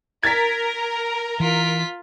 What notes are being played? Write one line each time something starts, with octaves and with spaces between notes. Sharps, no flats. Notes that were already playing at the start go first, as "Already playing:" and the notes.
A#4 G#6 A6 B6
E3 F4 B6